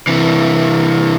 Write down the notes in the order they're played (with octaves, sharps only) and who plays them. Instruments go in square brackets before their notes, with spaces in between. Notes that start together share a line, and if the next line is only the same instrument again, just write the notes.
[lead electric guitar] C3 E3